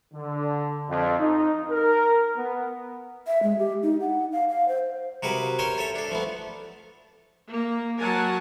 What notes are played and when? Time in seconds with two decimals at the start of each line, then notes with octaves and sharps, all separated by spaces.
0.14 D3
0.89 F2
1.20 D#4
1.71 A#4
2.36 B3
3.27 E5
3.43 G#3
3.59 G4
3.83 D#4
4.01 F#5
4.32 F5
4.49 F5
4.68 C5
5.23 C3 F#4 G#4 A#4 B4
5.59 C#4 A#4 C5 C#5 C6
5.78 A4 C#5 E5
5.95 D4 A4
6.11 F3 A3 B3
7.48 A#3
7.99 F#3 A#4 F#5 G#5 A5